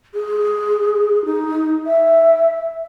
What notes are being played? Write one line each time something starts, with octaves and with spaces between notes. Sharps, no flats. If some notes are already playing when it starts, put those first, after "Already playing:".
G#4
D#4
E5